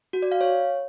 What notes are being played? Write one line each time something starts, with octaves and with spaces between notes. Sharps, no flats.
F#4
D5
F5
C#5